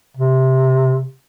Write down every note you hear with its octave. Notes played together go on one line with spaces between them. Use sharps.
C3